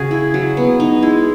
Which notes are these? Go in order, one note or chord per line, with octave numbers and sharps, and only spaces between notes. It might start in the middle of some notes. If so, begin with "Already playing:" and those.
Already playing: C#3 F#4 G#4
E4
F#3
B3
D#4
G#3 E4